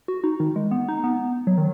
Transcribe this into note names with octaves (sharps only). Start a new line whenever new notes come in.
F#4
D#4
D#3
G#3
B3
D#4
B3
F#3
D#3